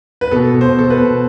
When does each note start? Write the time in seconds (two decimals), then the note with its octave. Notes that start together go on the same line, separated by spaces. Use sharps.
0.21 B4
0.31 B2 A4
0.54 B2
0.61 C5
0.76 B2 A4
0.90 B4
0.98 B2